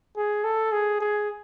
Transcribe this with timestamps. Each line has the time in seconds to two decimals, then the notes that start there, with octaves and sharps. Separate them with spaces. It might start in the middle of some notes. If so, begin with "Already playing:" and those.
0.17 G#4
0.44 A4
0.72 G#4
1.00 G#4